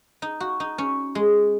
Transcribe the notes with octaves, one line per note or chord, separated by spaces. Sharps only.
D#4
F#4
D#4
C#4
G#3